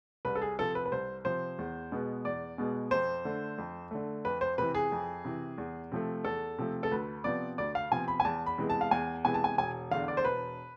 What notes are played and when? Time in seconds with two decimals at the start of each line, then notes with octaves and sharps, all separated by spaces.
0.25 C2 B4
0.35 A4
0.42 G#4
0.59 C3 F3 A4
0.75 B4
0.85 B4
0.92 C2 C5
1.25 C3 F3 C5
1.59 E2
1.92 B2 G#3 B3
2.25 E2 D5
2.58 B2 G#3 B3
2.91 F2 C5
3.25 D3 A3
3.58 F2
3.91 D3 A3
4.25 F2 B4
4.41 C5
4.58 C3 E3 B4
4.75 G#4
4.92 F2
5.25 C3 E3
5.58 E2
5.92 C3 F3 A3
6.24 E2 A4
6.58 C3 F3 A3
6.83 A4
6.91 D2 B4
7.24 C3 F3 B3 D5
7.58 D2 D5
7.75 F5
7.92 C3 F3 B3 G#5
8.08 B5
8.20 G#5
8.25 E2 A5
8.46 B5
8.58 C3 E3 G#3 B3
8.70 A5
8.81 F5
8.91 E2 G#5
9.24 C3 E3 G#3 B3 G#5
9.34 A5
9.44 G#5
9.58 E1 G#5
9.91 E2 D3 F5
10.08 D5
10.17 C5
10.24 E1 B4